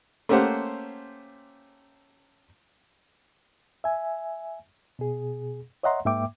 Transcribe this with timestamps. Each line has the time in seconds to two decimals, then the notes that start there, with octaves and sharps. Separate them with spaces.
0.29 A3 A#3 C#4 G4 C5 F#5
3.84 E5 G#5
4.99 B2 G#4
5.83 C#5 D#5 E5 F#5 A#5 C6
6.05 G#2 A#3 E5 G5 D6